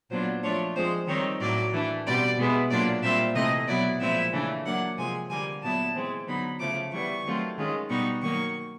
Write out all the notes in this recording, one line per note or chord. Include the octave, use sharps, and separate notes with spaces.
A#2 F#3 B3 D4 F4 C5
F3 A3 D4 F4 C#5
F3 G#3 C4 C5
D#3 G3 C4 D#4 C#5
A2 F#3 A#3 D5
E3 A3 D4
B2 G3 C4 D5
B2 G#3 B3 E4
A#2 F#3 A#3 D4 F4 D5
A#2 G3 C4 F4 E5
C3 E3 A3 C4 D#5
B2 F#3 B3 E4 D5
A#2 F3 G#3 C4 E4 E5
C#3 E3 A3 D4
F#3 A#3 D4 F#5
C3 F3 G#3 C4 G#5
D3 G3 A#3 G#5
A#2 F#3 B3 E4 A5
E3 G#3 C4
D3 F#3 B3 D#4 B5
C#3 F3 A3 D6
E3 G3 B3 C#6
D#3 F#3 A3 C4 F4
D#3 G#3 C#4 F4
B2 G3 B3 D#4 C#6
D#3 F#3 A#3 D#4 C#6